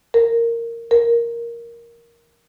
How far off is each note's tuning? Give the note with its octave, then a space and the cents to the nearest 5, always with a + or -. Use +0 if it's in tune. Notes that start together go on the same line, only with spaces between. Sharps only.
A#4 -10
A#4 +5